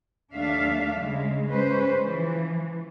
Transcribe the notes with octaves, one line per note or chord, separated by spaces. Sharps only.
D#2 F#3 A3 D4 E5 F5
C#3 G#3
G#3 C#4 B4 C5
E3 F3